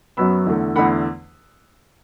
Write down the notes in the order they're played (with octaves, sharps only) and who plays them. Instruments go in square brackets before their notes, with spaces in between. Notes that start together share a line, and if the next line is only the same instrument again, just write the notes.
[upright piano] F#2 F#3 B3 B5 E6
E2 D3 A3
E2 D3 A3 F#5 B5